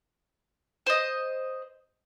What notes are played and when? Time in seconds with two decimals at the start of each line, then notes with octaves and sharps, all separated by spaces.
0.86 C5 D#5